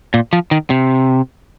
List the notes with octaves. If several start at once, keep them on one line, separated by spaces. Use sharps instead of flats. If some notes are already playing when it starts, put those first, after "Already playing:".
A#2
F3
D#3
C3